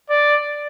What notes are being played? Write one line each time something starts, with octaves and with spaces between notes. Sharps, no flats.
D5